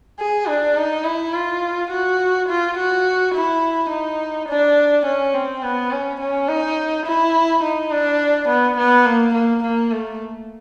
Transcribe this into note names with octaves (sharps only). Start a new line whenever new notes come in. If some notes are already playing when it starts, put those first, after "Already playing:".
G#4
D4
D#4
E4
F4
F#4
F4
F#4
E4
D#4
D4
C#4
C4
B3
C#4
C#4
D#4
E4
D#4
D4
B3
B3
A#3
A#3
A#3
A3